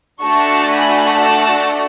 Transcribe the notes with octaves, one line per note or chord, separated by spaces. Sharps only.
A3 D4 F#4 A4 A5 C#6
G#5 B5
F#5 A5